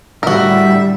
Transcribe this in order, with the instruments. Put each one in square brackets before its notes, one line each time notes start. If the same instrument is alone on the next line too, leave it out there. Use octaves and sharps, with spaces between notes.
[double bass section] A2 D3 G3 [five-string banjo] F#4 A#4 [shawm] E5